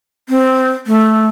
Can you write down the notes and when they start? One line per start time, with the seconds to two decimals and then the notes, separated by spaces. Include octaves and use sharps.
0.29 C4
0.87 A3